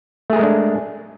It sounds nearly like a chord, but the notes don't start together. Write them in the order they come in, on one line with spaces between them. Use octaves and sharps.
A3 G#4 A#4 G#3 D4